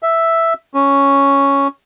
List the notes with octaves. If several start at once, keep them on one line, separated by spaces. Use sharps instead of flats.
E5
C#4